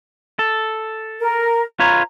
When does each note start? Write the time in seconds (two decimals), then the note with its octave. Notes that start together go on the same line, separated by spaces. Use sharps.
0.39 A4
1.19 A#4
1.80 F4 B4 C#5 A#5